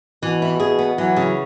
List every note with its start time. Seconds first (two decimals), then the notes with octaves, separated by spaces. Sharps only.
0.23 B2 E3
0.42 E4
0.60 G#4
0.79 B3
0.98 E3 F#3
1.16 C#3